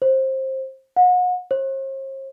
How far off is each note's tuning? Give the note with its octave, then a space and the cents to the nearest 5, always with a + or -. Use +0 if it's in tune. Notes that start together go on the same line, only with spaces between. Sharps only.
C5 +20
F#5 -35
C5 +45